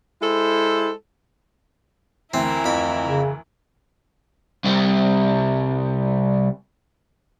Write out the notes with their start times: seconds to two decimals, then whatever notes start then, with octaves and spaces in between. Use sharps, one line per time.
0.22 G#3 E4 A4 C5
2.34 D2 E3 C4 E4 A#4
2.64 F2 B5
3.07 C#3
4.64 C2 G3